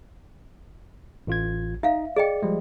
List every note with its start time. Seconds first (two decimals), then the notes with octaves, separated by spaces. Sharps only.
1.27 A1 F4 G#6
1.83 D#4 E5 F5
2.16 G#4 D5 D#5 G5
2.43 F3 G3 G#3